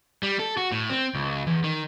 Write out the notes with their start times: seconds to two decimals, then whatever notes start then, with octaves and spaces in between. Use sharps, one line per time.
0.23 G3
0.40 A4
0.57 F#4
0.72 A2
0.90 C4
1.15 C#2
1.47 E2
1.64 D#3